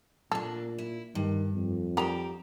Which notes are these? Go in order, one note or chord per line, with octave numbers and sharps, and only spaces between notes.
A#2 A#3 D4 A4
E4
G2 D#3
F2
D#3 G3 C4 G4 A#5